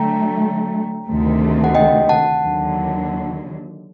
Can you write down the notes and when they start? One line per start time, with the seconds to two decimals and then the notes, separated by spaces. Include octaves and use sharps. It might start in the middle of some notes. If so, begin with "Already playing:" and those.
Already playing: D3 F#3 A3 G5 A#5
1.07 D2 C3 D#3 A3
1.64 F#5
1.75 D#5 G5
2.09 F#5 A5
2.43 D#2 D3 F#3